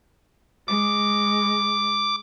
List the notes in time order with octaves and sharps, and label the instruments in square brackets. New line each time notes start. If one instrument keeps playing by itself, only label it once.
[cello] G#3 [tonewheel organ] D6